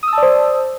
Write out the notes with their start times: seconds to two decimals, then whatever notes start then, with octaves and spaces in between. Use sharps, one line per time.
0.03 D#6
0.08 E6
0.13 A5
0.18 D5
0.22 C5